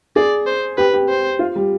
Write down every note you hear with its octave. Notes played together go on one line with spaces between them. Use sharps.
G#4 D5
C5
G4 B4
G4
C5
F4
G3